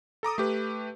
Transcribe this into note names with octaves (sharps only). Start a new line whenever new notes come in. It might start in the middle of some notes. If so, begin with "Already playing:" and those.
A4 A#5 D6 D#6
A3 G4 B4